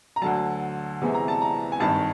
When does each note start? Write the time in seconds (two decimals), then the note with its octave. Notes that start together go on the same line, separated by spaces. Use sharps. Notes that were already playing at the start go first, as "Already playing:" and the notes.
0.16 A#5
0.22 D2 D3 F#3 A5
1.01 E2 C3 E3 G#3
1.14 A#5
1.28 A5
1.42 A#5
1.72 G#5
1.80 G#1 G2 D#3 A5